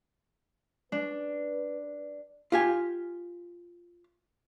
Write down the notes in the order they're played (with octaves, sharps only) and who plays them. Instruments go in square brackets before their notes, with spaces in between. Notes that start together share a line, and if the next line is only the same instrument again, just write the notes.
[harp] D4 [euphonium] B4
[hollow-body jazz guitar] F4 G4 G#5